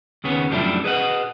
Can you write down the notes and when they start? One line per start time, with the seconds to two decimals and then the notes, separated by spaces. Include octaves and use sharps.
0.24 D#2 C#3 B3 C#4
0.51 F#2 F3 G3 A3 D4 E4
0.84 G#4 B4 D#5 F#5